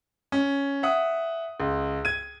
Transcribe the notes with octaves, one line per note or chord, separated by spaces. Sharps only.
C#4
E5 F#5 D#6
C#2
G#6 D#7